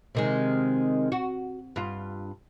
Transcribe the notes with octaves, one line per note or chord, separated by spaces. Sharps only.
C3 D#3 G#3
F#4
G2 F4